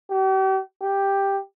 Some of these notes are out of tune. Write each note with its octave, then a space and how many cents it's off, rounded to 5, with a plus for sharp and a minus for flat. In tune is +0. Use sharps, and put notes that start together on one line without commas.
G4 -40
G4 +5